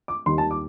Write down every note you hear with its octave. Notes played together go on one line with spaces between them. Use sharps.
D6
D#2 D#3 G3 C6
A5
D6